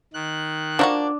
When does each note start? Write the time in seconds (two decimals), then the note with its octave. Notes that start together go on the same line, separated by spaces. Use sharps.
0.14 D#3 F#6
0.79 F3 A#3 D4 F#4